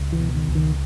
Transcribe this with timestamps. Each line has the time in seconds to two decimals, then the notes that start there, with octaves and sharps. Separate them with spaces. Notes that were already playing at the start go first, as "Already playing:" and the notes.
Already playing: C#2
0.12 E3
0.20 B2
0.35 D#3
0.48 C#2
0.55 D#3